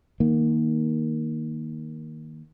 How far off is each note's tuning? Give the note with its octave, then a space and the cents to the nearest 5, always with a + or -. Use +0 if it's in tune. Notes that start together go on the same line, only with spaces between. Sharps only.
D#3 +0 A#3 +0